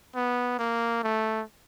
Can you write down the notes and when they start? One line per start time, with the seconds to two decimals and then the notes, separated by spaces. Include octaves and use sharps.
0.15 B3
0.59 A#3
1.03 A3